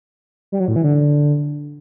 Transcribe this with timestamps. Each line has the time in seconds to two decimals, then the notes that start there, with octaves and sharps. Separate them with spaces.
0.52 G3
0.60 F#3
0.68 A2
0.76 E3
0.84 D3